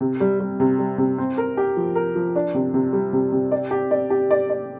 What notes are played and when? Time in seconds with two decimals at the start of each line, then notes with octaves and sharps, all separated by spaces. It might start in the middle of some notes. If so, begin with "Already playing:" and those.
0.01 C3
0.20 G3
0.40 G3
0.60 C3
0.79 G3
0.98 C3
1.18 C4
1.38 A#4
1.57 G4
1.77 F3
1.95 A#4
2.15 F3
2.36 D4
2.54 C3
2.74 C3
2.93 G3
3.13 C3
3.32 C3
3.52 D5
3.71 G4
3.91 D5
4.10 G4
4.31 D5
4.50 D5